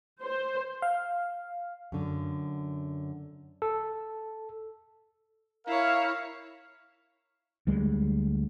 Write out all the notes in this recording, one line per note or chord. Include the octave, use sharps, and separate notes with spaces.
C5
F5
F#2 D3
A4
E4 A#4 C#5 F5
D2 G3 G#3